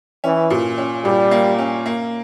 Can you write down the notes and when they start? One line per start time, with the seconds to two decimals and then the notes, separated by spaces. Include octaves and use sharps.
0.24 E3 C#4
0.50 A#2
0.78 C#4
1.05 A#2 G3
1.31 A#3
1.59 C#4
1.86 A#3